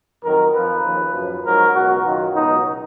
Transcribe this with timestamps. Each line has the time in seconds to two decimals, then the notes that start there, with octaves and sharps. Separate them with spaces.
0.23 F2 D#3 F#3 A#4
0.53 F2 F3 B4
0.84 D#2 C#3 F3
1.14 F#2 F3
1.44 G#2 F#3 A#4
1.74 C#2 B2 F#3 F#4
2.04 F#2 D#3 F#3 F4
2.34 C#2 B2 F#3 D#4